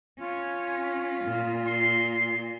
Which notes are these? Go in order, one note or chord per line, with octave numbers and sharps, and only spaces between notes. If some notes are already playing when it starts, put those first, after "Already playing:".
C#4 F4
A#2
C6